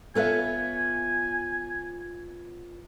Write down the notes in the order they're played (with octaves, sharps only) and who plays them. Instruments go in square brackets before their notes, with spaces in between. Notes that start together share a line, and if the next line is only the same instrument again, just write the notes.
[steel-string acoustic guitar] B3 F4 C#5 [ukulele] A4 B4 E5 [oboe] G#5